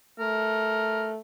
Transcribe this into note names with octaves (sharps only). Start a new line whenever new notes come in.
A3 A#4